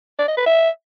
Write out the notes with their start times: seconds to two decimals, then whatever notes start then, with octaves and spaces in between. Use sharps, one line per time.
0.19 D5
0.28 D#5
0.37 B4
0.47 E5